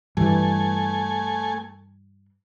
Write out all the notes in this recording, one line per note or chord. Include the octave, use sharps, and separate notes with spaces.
G2 E3 A3 G#5